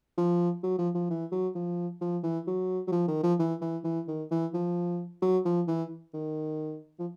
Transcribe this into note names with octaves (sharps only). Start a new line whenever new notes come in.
F3
F#3
F3
F3
E3
F#3
F3
F3
E3
F#3
F#3
F3
D#3
F3
E3
E3
E3
D#3
E3
F3
F#3
F3
E3
D#3
F3